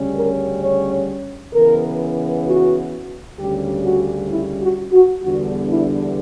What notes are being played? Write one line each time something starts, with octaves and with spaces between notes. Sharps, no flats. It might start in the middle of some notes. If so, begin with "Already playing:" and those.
Already playing: D2 C#3 G3 C#4
A#4
C#5
C#3 E3 B3 A#4
F#4
D2 C#3 G3 C#4 G4
F#4
E4
F#4
F#4
E2 D3 G3 B3 D4 F#4
E4